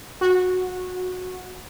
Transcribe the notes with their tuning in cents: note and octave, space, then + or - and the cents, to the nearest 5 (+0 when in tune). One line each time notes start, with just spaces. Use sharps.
F#4 -15